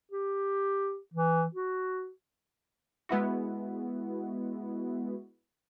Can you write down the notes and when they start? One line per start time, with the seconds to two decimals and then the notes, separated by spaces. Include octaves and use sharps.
0.12 G4
1.14 E3
1.55 F#4
3.09 G#3 B3 E4 F#4